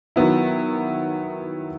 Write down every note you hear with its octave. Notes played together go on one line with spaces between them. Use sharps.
D#3 F#3 B3 E4